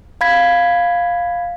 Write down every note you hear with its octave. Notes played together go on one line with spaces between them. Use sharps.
F5 B5 G#6 B6